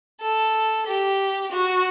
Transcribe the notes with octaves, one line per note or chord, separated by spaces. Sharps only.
A4
G4
F#4